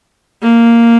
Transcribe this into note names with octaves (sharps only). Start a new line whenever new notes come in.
A#3